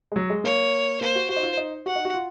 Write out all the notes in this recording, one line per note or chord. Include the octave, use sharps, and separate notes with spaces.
G#3
F#3
G#3
A#3 C#5
A#3 C5
F#4
F#4 C5
D#4
F4
D#4
F#4 F#5
D#4
F#4
F4